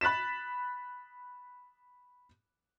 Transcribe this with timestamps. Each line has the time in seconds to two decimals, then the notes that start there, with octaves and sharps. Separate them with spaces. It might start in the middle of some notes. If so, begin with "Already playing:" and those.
0.01 B5 F#6 A6 B6 E7